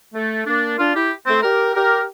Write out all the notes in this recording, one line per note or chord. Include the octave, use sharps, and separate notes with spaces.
A3
A#3 D4
D4 F4
E4 G4
A3 C4
G4 A#4
G4 A#4